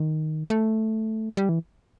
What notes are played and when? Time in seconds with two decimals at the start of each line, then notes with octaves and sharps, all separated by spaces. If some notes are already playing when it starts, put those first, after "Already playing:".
Already playing: D#3
0.50 A3
1.37 G3
1.49 E3